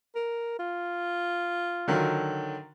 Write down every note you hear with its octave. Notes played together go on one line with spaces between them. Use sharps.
A#4
F4
D3 D#3 F#3